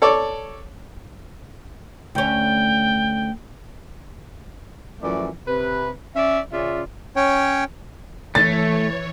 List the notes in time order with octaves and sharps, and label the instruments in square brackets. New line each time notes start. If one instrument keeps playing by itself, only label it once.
[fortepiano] A4 C#5 D5
[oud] D2 C#4 [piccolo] G5
[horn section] F#2 E3 F3 A3 D5
C3 B4
C#4 D5 E5
C#3 C#4 F4 D5 E5
[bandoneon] C#4 C#5 G5
[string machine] E3 C#5 [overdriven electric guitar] A3 [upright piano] A6